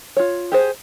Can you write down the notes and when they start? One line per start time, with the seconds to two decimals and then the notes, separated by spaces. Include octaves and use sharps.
0.17 F4 C#5
0.52 G4 G#4 C5